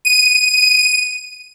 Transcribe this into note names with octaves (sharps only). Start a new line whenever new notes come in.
D#7